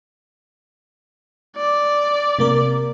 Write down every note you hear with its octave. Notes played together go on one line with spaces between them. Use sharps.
D5
C3 A#3 A#4